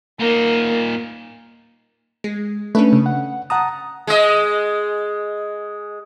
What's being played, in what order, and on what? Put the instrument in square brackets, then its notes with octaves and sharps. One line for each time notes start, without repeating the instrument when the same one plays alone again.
[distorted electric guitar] A#2 D#4 [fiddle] A#3
[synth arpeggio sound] G#3
[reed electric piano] A3 [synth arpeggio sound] C#4 D4 B4
[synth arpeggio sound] C#3
[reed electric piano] F#5
[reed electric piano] F#5 A#5 D#6 [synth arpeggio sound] A5
[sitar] G#3 D#5